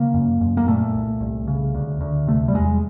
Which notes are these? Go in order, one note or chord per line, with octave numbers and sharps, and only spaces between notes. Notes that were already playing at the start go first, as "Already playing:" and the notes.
Already playing: C#3 A#3
F#2
F#2
A#3
A#2 A3
C2
C2
C#3
D2
D2
C3 A3
G3
E2 G#3